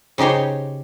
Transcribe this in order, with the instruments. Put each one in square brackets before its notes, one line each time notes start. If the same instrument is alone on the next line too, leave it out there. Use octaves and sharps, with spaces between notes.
[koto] C#3 D#4 G4 C5 C#5